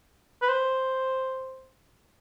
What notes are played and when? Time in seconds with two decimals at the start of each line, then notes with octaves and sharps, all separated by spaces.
0.42 B4
0.49 C5